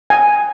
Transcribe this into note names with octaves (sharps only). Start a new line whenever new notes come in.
G#5